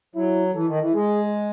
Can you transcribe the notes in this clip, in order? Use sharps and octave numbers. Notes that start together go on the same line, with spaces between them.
F#3 E4
E3 A4
D#3
E3
G#3 G#4